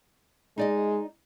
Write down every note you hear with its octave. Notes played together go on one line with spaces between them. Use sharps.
G#3 D#4 D5 D#5